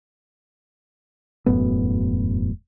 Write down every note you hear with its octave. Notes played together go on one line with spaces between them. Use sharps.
E1 F#2 A2 B3